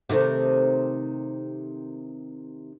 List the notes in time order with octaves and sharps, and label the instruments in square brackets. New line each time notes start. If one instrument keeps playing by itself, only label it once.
[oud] C3 D#3 A3